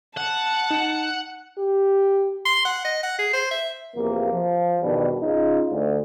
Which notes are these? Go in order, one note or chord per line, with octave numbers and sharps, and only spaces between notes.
F#5 A5
D#4
G4
C6
F#5
D#5
F#5
G#4
C5
E5
E2 C3 F3 A#3
F3
E2 B2 D#3 G3 D4 B4
C#3 D#4 F4
D2